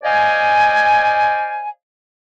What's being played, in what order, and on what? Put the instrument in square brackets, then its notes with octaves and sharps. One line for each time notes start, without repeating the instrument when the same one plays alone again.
[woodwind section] C5 D5 D#5 F5 G#5